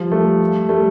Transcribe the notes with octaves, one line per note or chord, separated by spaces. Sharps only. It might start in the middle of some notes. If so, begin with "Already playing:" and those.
Already playing: F3 G3
G3 A3
G3 A3